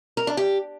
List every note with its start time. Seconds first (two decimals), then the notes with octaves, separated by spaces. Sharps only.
0.17 A#4
0.27 D4
0.37 G4